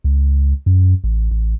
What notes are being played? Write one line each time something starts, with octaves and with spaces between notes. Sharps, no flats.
C#2
F#2
A1
A1